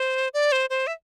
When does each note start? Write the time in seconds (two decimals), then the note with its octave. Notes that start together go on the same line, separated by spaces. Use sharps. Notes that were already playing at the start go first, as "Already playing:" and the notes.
Already playing: C5
0.34 D5
0.52 C5
0.70 C5
0.87 E5